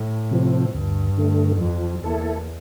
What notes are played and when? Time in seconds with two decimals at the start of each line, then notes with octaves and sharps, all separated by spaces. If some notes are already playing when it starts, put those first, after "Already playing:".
Already playing: A2
0.31 C3 F3 C4
0.74 D2 G2
1.18 D3 A3
1.60 F2 F3
2.03 E2 A#3 E4 A4